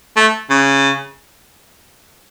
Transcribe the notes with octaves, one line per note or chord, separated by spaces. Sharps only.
A3
C#3